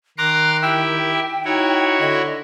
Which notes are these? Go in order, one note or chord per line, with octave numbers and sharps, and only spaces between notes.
D#3 A#5 C6 D6 F#6
E4 G4 E5 G5
D#4 E4 F#4 C#5
D3 D#5